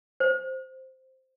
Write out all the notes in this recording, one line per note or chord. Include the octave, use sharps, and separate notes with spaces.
C5